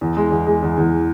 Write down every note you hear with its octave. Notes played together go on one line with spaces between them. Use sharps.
E2
G#3
E2
G#3
E2
E2